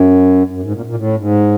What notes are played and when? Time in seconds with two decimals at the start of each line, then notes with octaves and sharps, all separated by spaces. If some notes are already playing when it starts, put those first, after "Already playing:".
Already playing: F#2
0.51 F#2
0.63 G#2
0.74 A#2
0.86 A#2
0.96 A2
1.18 G#2